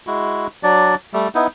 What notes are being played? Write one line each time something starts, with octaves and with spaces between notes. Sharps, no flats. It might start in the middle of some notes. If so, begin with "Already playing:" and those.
G#3 E4 F#4
F#3 D4 D5
G3 A3
B3 D#4 E4